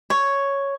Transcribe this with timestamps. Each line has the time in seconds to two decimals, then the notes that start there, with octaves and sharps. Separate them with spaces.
0.10 C#5